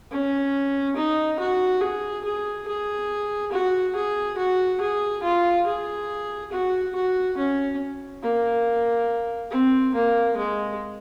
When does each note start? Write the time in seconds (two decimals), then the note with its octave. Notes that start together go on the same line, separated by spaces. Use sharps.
0.11 C#4
0.96 D#4
1.39 F#4
1.81 G#4
2.24 G#4
2.68 G#4
3.52 F#4
3.95 G#4
4.37 F#4
4.81 G#4
5.23 F4
5.66 G#4
6.52 F#4
6.95 F#4
7.37 C#4
8.22 A#3
9.51 C4
9.94 A#3
10.37 G#3